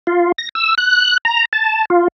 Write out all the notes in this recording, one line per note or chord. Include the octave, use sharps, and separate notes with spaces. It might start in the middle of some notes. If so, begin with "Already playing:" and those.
F4
A#6
E6
F#6
A#5
A5
F4